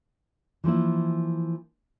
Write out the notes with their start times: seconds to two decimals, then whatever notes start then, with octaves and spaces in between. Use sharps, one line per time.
0.64 E3 F3 A#3 E4